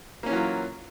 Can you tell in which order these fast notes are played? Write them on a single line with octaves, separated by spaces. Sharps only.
A#3 C#4 E3 F#3 F4